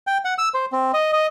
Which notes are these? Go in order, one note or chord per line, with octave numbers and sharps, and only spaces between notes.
G5
F#5
E6
C5
C4
D#5
D#5